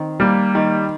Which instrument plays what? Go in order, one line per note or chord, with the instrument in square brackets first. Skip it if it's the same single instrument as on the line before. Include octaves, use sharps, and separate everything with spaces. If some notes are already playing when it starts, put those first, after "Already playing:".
Already playing: [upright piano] D#3 C4
[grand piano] G3 [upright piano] A#3
[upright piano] D#3